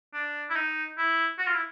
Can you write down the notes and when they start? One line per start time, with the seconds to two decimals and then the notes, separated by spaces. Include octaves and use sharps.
0.14 D4
0.50 E4
0.56 D#4
0.98 E4
1.39 F#4
1.46 F4
1.54 E4